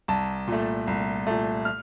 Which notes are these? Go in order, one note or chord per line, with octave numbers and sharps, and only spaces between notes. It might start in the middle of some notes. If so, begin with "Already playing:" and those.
C2 A5
A#2 A3
C2
A#2 A3
F6